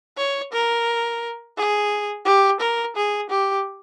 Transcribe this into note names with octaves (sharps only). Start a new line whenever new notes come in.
C#5
A#4
G#4
G4
A#4
G#4
G4